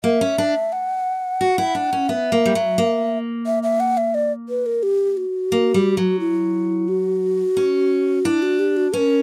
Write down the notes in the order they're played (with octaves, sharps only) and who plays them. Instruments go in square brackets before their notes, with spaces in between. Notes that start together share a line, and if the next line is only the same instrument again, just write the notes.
[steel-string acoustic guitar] A#3 [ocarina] E5
[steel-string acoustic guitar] C#4
D4
[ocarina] F#5
[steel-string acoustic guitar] F#4
E4
D4
C#4
[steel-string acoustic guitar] B3 [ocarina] E5
[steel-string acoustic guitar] A#3
G3
F#3
A#3
[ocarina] E5
E5
F#5
E5
D5
B4
A#4
G4
F#4
[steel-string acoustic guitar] A#3
G3
F#3
[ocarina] E4
F#4
[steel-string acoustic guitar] C#4
[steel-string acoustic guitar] D4 [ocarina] E4
[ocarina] F#4
G4
F#4
[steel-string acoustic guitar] C#4 [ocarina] A#4 B4